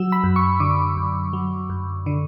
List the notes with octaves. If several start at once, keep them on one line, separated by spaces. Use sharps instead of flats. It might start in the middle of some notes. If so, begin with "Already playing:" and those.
Already playing: F#3 E6
B5
F#2
C#6
D3 D6
F#2
F#3
F#2
D3